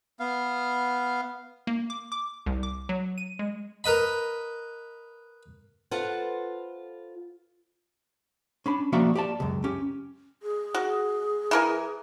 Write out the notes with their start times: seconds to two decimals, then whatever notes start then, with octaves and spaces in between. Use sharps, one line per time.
0.20 B3 F5
1.67 A#3
1.90 D6
2.12 D6
2.46 C2
2.63 D6
2.89 F#3
3.18 D#7
3.39 G#3
3.84 A#4 B4 D#5 B5
5.91 F4 A4 B4 C5 F#5
8.66 C#4 D4 B5
8.93 F3 A#3 F#4 D5 E5
9.15 G4 D5 A5
9.40 C#2 F#2
9.64 C#4 G4
10.43 G#4
10.74 F#4
11.51 E3 A#4 G#5